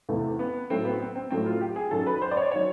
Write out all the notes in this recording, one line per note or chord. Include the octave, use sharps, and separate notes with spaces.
E2 C3 E3 A3
B3
A2 F#3 A3 C4
B3
C4
C4
A2 F#3 A3 C4
F4
G4
G#4
F#2 D#3 F#3 A4
B4
C5
D5
C#5
D#3 F#3 C#5